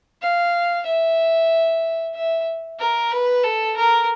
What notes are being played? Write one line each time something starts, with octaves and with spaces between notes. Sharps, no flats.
F5
E5
E5
A#4
B4
A4
A#4